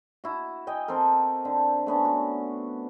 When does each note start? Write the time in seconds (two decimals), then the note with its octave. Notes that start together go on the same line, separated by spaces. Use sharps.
0.24 E4 F#4
0.67 D#5 G5 G#5
0.88 C4 A4 A#4
1.45 D3
1.87 A3 B3 C#4 D4
2.05 F#4